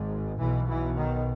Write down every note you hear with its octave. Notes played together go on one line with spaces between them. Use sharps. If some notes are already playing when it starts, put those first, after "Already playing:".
Already playing: G#1 G#2
B1 B2 E3
E3
D#3